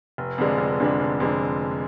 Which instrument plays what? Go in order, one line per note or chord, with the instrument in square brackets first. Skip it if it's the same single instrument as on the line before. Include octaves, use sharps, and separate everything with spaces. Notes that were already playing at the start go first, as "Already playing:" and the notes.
[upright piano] F1
F2 D3 G#3 D4
F1
F2 D3 G#3 D4
F1
F2 D3 G#3 D4